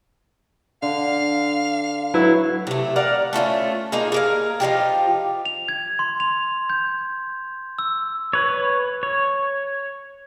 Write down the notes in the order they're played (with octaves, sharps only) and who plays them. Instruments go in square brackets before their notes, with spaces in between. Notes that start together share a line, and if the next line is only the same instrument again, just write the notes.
[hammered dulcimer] D3 [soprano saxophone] F5
[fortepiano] F#3 E4 B4
[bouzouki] C3 A3
A#4 D5 F5 F#5
A3 C#4 D#4 F4
A#3 D#4 F4 G#4
G#4 A#4 F5
F3 D#4 F4 G4
[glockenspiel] F7
G#6
C6
F7
G6
E6
[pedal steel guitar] B4 C#5
C#5